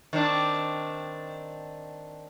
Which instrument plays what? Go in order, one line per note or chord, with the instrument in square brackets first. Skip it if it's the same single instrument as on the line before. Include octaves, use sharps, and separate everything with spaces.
[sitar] D#3 C4 D4